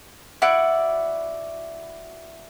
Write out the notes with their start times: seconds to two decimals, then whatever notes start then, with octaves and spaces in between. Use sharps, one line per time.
0.42 E4 F#4 D5